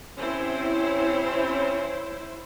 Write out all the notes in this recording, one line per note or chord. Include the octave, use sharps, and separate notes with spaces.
C3 C4 C#4 E4 C5